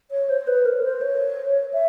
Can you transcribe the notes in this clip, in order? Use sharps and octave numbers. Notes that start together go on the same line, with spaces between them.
C#5
C5
B4
A#4
C5
C#5
E5